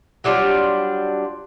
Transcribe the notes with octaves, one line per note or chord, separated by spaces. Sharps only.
F#3 G3 D4 F4